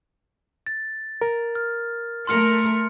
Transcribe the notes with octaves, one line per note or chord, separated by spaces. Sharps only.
A6
A#4
F6
A3 A#4 C6 F6 C#7